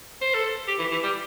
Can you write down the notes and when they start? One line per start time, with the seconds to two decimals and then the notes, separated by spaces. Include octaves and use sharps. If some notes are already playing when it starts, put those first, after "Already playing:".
0.22 C5
0.34 A4
0.68 G4
0.79 E3
0.91 E3
1.03 G3